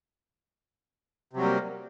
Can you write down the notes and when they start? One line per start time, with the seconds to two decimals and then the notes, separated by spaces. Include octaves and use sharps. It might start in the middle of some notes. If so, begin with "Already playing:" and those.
1.33 C3
1.37 F#3
1.40 G3
1.44 A#3